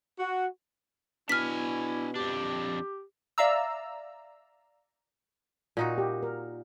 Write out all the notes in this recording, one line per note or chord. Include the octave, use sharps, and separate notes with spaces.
F#4
B2 D4 E4 G#5 F6 B6
F2 D4 G4
D5 E5 F5 A#5 E6
A#2 D#4 F#4
G4
A#4